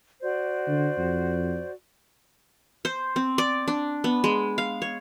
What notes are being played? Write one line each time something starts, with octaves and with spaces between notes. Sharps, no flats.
F#4 C5 D5
D3
F2
C5
C4
D5
D4
B3
G#3
F5
C#5